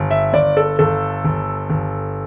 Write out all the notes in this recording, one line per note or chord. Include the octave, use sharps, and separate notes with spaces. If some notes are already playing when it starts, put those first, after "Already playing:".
Already playing: G1
E5
G1 D5
A4
G1 A4
G1
G1